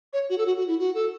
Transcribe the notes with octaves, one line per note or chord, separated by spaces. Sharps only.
C#5
F#4
A4
F#4
F#4
E4
F#4
A4